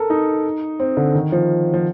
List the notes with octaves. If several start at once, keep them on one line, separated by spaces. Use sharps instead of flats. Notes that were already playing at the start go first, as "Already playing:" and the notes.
Already playing: A4 A#4
D#4
C4
D3
D#3
F3
F3